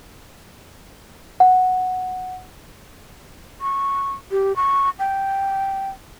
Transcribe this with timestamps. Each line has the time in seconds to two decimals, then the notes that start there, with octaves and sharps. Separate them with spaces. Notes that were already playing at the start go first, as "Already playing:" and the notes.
1.40 F#5
3.61 C#6
4.31 G4
4.56 C#6
4.99 G5